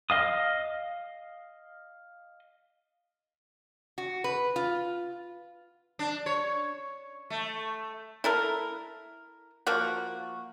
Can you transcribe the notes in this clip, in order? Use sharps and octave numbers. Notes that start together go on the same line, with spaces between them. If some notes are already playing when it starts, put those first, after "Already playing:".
D#5 F5 D#6
F#4
B4
F4
D4
C#5
A3
E4 A4 A#4
F3 A#3 F#4